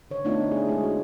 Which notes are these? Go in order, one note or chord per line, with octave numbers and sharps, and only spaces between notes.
D3 C#5
A3 B3 C4 D4 D#4 F4
E4 G#4
G#3 E4 G#4
F#4